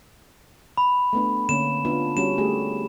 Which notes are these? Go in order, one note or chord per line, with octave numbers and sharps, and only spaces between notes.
B5
A3 B3 D4
D3 A#3 C#4 E7
B3 D4 F4
G3 C#4 F#4 E7
A3 G4 G#4